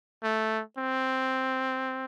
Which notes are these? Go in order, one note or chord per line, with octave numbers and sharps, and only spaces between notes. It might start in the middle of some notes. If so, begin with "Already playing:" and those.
A3
C4